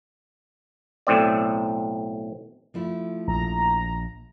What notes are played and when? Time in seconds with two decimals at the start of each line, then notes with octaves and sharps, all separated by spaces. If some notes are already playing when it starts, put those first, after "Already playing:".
1.07 B1 A2 C4 D5
2.74 F3 A3 E4
3.28 A#1 A#5